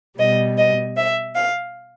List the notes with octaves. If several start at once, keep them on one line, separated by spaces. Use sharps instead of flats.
B2 G3 D#5
D#5
E5
F5